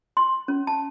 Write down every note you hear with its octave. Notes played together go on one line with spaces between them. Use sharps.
C6
C#4
A5